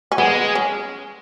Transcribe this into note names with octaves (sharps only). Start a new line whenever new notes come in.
C#4
G#3 B3
C#4